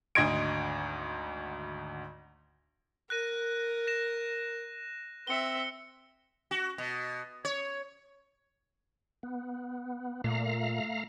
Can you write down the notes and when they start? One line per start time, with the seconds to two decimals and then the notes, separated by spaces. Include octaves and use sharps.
0.15 G#1 D2 D#5 C6 G#6 D7
3.10 A#4 F#6 A#6 D#7
3.87 A#6 E7
5.27 C4 E5 C#7 G7
6.51 F#4
6.78 B2
7.45 C#5
9.23 B3
10.24 A#2 A3 F5 A#5